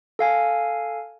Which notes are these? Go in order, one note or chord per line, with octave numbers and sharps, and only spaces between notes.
A4 F5 G#5